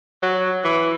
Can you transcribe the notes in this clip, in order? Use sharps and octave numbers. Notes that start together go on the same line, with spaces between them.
F#3
E3